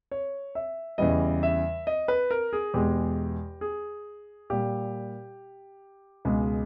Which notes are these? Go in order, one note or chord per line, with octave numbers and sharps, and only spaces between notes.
C#5
E5
E2 C#3 E3 G3 D#5
E5
D#5
B4
A#4
G#4
E2 B2 G#3 G4
G#4
A#2 G3 G4
C#2 B2 G#3